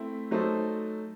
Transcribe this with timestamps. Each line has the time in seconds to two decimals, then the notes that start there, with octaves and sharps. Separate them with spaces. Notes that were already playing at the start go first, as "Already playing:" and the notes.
Already playing: A3 C4 E4
0.31 F#3 A3 D#4 A4 C5